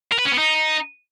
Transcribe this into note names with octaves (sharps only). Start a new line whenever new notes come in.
A#4
B4
C#4
B3
D#4